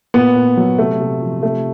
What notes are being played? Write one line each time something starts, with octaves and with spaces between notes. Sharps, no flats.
A#2 B3
A#2
F#3
C3 A3
C3
F3
C3 A3